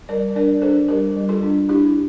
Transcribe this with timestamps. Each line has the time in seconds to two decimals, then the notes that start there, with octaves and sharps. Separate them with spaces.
0.09 G3 A#4 D5
0.35 D4 A#4 D5
0.62 D4 A4 C5
0.88 G3 G4 A#4
1.16 G3
1.29 F4 A4
1.43 D4
1.69 D4 E4 G4